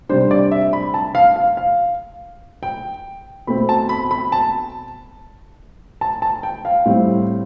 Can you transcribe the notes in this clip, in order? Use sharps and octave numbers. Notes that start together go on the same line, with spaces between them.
C3 G3 D4 C5
D5
E5
B5
A5
F5
F5
F5
G5
B2 A3 C4 B5
A5
B5
B5
A5
A5
A5
G5
F5
A2 G3 C4